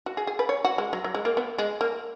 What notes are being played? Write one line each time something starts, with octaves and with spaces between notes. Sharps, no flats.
F#4
G#4
G#4
B4
C#5
F#4
G#3
F#3
F#3
G#3
A#3
B3
G#3
A#3